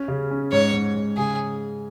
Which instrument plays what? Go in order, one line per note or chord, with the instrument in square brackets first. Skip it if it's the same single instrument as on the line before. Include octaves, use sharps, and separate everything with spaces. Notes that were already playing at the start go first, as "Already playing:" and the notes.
Already playing: [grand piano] C#4
C#3
C#4
[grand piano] G#2 [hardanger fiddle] C#5
[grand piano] G#2
G#2
[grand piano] C#3 [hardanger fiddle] G#4